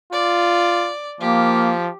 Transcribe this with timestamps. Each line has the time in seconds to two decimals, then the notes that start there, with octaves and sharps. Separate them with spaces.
0.12 F4 D5
1.21 F3 A#3 G4